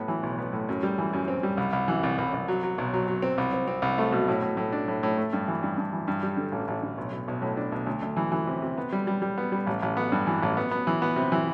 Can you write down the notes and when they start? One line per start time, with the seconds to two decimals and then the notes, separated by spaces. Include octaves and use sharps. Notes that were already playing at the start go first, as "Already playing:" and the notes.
Already playing: A2 B3
0.08 E3
0.23 B1
0.39 B3
0.53 A2
0.69 F#2
0.83 G3
0.98 E3
1.13 F#2
1.28 C4
1.43 G3
1.57 C2
1.73 C2
1.88 E3
2.03 C2
2.18 C2
2.33 C2
2.48 F#3
2.63 F#3
2.78 B1
2.93 F#3
3.08 F#3
3.22 C4
3.38 C2
3.53 C4
3.68 C4
3.82 C2
3.98 A3
4.12 B2
4.28 A2
4.42 A2
4.57 A2
4.73 D4
4.88 A2
5.03 A2
5.18 A3
5.33 G2
5.48 E3
5.63 G2
5.78 G2
5.93 E3
6.08 G2
6.23 G3
6.37 D3
6.52 A1
6.68 A1
6.82 D3
6.98 B1
7.12 B1
7.28 B1
7.42 A2
7.57 D4
7.72 B1
7.87 D2
8.02 D2
8.17 E3
8.32 E3
8.47 C3
8.62 C3
8.78 B3
8.92 G3
9.07 G3
9.22 G3
9.38 B3
9.52 G3
9.67 A1
9.82 A1
9.97 B3
10.12 G2
10.27 E3
10.42 A1
10.57 B3
10.71 B3
10.87 E3
11.02 B3
11.16 C3
11.32 E3